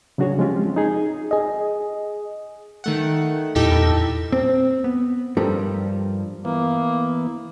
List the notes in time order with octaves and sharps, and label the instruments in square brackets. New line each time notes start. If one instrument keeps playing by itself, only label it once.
[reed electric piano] C#3 F#3 D4 F#4 G#4 C#5
F3 G#3 C4 C#4 F4 G4
D#4 G#4
[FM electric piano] G#4 D#5
[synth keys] D#3 A3 F#5
[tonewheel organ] E2 A#2 E4 [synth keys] D#4 G4 A4
[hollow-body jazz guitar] C4
B3
G2 F3 G3 G4 A4 A#4
[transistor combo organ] E3 B3 [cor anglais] A#3